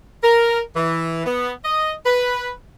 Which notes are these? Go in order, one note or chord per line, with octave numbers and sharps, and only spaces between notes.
A#4
E3
B3
D#5
B4